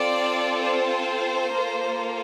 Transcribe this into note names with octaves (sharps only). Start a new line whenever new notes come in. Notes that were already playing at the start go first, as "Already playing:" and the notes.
Already playing: C4 F4 A4 D5
C5
A#3 F4 A4